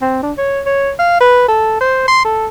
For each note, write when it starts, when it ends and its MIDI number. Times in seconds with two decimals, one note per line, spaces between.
0.02 0.21 60
0.23 0.32 62
0.38 0.61 73
0.66 0.91 73
0.99 1.18 77
1.21 1.47 71
1.49 1.76 69
1.81 2.04 72
2.08 2.24 84
2.25 2.47 69